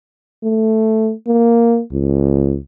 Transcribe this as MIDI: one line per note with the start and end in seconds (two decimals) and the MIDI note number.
0.44 1.12 57
1.27 1.81 58
1.92 2.57 37